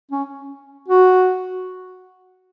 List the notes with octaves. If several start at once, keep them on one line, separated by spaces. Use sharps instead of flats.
C#4
F#4